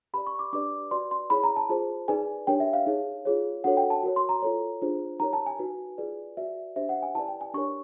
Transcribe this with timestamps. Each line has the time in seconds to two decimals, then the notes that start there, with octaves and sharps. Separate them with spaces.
0.14 G4 B4 D5 B5
0.27 C#6
0.39 D6
0.53 D4 G4 B4 D5 D6
0.91 F#4 B4 D5 C6
1.11 C6
1.30 E4 G#4 C#5 B5
1.44 A#5
1.56 A5
1.69 F4 G#4 C5 A5
2.08 D#4 G#4 B4 D5 G#5
2.47 D4 G4 A#4 C#5 G5
2.60 E5
2.73 F5
2.87 D#4 G#4 C#5
3.25 F4 G#4 C#5
3.64 D4 F#4 A4 C#5 F#5
3.77 G5
3.90 A5
4.03 F#4 A#4 C#5
4.16 C6
4.29 A#5
4.42 F4 A4 C#5
4.82 D4 F4 G#4 C5
5.20 D#4 G4 A#4 C#5 A#5
5.33 A5
5.46 G#5
5.59 D#4 F#4 B4
5.98 F4 G#4 B4 D5
6.37 F#4 B4 D5 E5
6.76 D4 G4 C5 E5
6.89 F#5
7.03 G#5
7.15 E4 G4 B4 D5 A5
7.28 G5
7.41 G#5
7.54 D4 G4 A#4 C#5 C#6